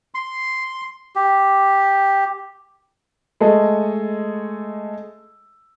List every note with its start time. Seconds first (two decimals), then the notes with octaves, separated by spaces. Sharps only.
0.14 C6
1.16 G4
3.40 G#3 A3 A4 D#5